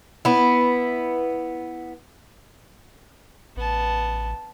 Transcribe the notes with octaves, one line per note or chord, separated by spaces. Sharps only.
B3 E4
A1 B3 A5